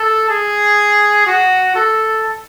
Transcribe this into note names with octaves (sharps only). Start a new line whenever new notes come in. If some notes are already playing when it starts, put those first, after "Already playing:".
Already playing: A4
G#4
F#4
A4